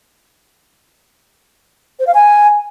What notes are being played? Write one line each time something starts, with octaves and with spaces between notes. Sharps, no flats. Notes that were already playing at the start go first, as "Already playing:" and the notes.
C5
F5
G#5